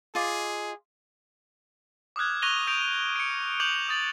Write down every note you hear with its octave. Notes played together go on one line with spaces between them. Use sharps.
F4 G#4 D#5 D6
D6 D#6 F6 F#6 G#6
C#6 F#6 A#6 D#7 F7 G7
D#6 G6 A#6 D7 F7
C#7 D7
D6 G6 D7 F7 F#7
D#6 A6 F#7